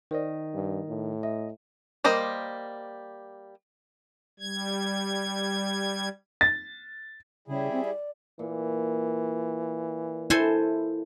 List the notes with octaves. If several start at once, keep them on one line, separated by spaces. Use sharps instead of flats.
D#3 A#4 C5 D5 D#5
G2
A2
D#5 E5
G3 A#3 C5 D#5
G3 G#6
A6
C#3 G3 E4 G#4
C4
D5
A#2 E3
E4 A4 C5 G#5